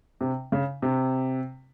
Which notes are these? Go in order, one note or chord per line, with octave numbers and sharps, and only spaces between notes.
C3
C#3
C3